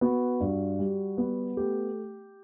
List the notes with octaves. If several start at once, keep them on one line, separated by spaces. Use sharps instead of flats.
B3 F#4
G2
G3
B3
A3 G4